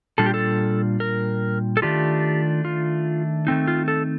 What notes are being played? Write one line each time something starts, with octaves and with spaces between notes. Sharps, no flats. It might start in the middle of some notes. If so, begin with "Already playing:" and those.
A#2 G3 D4 F4 A4
G4
A4
A#4
A4
D#3 A3 D4 F4 G4
F4
D#3 A3 C4 D#4
F4
A4